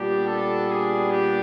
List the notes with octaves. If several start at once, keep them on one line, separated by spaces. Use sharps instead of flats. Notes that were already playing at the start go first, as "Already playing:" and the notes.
Already playing: A#2 G3 B3 D4 G4
A4
G#4
G4